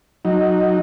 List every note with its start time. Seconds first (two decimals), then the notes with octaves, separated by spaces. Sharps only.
0.25 F#3 D#4